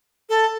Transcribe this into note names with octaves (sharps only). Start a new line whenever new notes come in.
A4